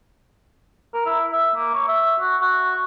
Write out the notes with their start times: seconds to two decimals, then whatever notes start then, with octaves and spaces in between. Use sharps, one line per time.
0.94 A#4
1.06 E4
1.32 E5
1.56 A#3
1.74 C#5
1.88 E5
2.20 F#4
2.41 F#4